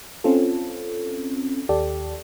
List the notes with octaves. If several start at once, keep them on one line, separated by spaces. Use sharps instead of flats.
C4 C#4 F4 A4
D#2 G4 A4 D5